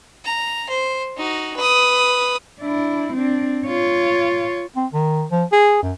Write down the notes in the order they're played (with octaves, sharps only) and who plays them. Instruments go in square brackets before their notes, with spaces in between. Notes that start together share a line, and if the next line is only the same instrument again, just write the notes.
[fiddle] A#5
C5
D#4 F#4
B4 D#6
[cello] D4 E4
C4 D4
F4 C#5
[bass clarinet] C4
D#3
F3
G#4
F#2